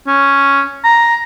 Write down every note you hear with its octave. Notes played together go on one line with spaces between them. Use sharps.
C#4
A#5